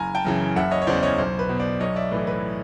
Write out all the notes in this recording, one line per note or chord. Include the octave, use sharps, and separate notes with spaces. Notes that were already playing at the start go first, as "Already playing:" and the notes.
Already playing: F#1 G#5 A#5
G5 A5
F#2 C#3 E3
F#1 E5 F#5
C#5 D#5
C#5
E2 C#3 E3 C5 D5
C#5 D#5
B1 C5
B4
B2
C5 D5
B1 C#5 D#5
D5 E5
A2 E3 B4
B4